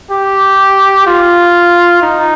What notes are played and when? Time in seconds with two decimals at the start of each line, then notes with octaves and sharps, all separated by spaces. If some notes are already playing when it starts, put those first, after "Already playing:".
0.11 G4
1.07 F4
2.02 D#4